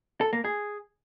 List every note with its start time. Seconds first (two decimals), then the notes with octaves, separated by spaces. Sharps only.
0.21 A4
0.33 A#3
0.45 G#4